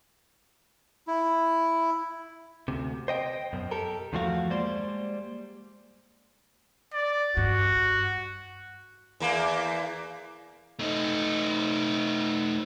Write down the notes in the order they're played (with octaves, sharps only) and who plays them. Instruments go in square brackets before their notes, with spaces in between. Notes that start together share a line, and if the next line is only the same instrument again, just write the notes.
[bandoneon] E4
[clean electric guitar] D2 C3
C5 D#5 G5
F#2 B2
G4 A4 A#4
E2 G2 F3 A3 F#4 F5
G3 G#3 A#3 C5 D5 C6
[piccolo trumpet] D5
[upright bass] G2 [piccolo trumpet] F#4
[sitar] E2 A#3
[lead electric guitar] A3 D#4